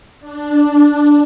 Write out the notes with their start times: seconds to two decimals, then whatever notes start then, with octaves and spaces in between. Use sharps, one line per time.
0.20 D4